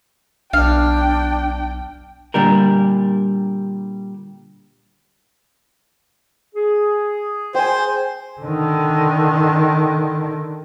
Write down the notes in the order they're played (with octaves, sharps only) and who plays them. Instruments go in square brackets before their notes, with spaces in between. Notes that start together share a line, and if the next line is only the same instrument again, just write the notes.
[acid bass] B1 [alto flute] D4 [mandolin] F5 [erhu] G5
[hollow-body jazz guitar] A#2 D3 G3 A#4
[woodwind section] G#4
[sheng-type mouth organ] C5 [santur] G5 G#5
[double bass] D3 D#3